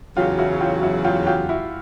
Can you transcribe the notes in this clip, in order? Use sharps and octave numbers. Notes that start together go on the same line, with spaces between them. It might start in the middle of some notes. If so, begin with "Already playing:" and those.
E2 C#3 F#3 F4 G4
E4 F#4
F4 G4
E4 F#4
F4 G4
F4 G4
E4 F#4